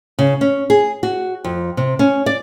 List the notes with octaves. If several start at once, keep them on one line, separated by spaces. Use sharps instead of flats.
C#3
C#4
G#4
F#4
F2
C3
C#4
D5